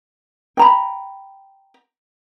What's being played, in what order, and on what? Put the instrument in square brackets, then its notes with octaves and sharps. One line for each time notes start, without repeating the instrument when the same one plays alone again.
[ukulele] G5 A#5 B5